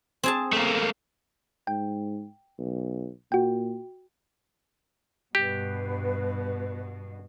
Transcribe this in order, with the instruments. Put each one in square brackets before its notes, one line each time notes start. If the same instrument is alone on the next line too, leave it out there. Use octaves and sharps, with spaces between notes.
[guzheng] C4 G#4 A5
[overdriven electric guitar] A3 A#3
[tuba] G#2 [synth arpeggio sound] G5
[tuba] B1
[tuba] A#2 [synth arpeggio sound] F#4 G5
[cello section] G2 B2 [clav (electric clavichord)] G4 [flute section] B4